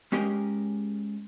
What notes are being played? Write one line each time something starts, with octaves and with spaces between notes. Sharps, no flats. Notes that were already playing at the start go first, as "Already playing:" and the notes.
G#3 C#4 G4 G#4 A#4 D#5